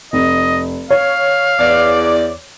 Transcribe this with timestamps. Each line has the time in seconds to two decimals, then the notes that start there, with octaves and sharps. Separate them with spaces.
0.13 F1 D#5
0.90 C#5 F5
1.59 E2 D5